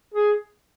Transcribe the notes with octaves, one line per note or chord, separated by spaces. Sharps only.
G#4